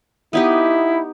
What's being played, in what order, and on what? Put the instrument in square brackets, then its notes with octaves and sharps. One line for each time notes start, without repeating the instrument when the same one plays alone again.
[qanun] B3 D#4 G4 [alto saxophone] E4